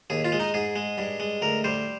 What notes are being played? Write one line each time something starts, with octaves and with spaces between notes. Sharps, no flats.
D#2 G#4
F4
G#3
D#4
G#2 G#4
G#3
G2
G#3
D2 A#4
G3 C5